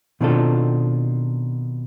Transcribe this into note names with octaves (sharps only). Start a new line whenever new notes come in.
B2 D#3 C4 D4 F4 A4